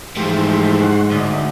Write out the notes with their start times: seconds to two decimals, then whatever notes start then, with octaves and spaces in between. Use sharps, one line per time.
0.17 G#2 E3 F3 A3 G4 C5
0.81 F#5 C6 C#6
1.12 D2 A2 D#4 D5